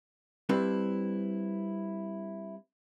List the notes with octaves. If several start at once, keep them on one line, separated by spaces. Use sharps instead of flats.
G3 C4 D4 E4 B4